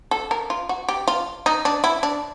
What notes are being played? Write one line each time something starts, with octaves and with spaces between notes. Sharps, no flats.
A4
A#4
F4
F#4
G4
F4
D#4
D4
E4
D4